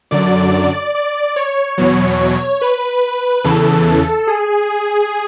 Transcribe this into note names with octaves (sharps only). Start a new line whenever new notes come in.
F#2 D3 F#3 D5
D5
C#5
E2 B2 F#3
B4
E2 C#3 E3 A4
G#4